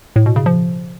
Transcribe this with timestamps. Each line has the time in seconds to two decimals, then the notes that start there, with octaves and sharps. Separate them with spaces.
0.16 A2
0.26 B2
0.36 C#3
0.46 F3